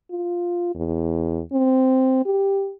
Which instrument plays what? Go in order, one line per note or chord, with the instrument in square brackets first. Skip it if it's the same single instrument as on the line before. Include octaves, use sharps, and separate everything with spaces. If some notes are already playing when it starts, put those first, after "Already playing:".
[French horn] F4
E2
C4
G4